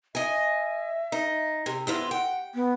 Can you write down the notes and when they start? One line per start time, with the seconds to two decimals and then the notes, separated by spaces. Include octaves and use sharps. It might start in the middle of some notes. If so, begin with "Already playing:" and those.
0.15 D#5 E5 G#5
1.12 D#4
1.66 C3
1.87 F2 B3 E4 F4
2.11 F#5 G5
2.55 B3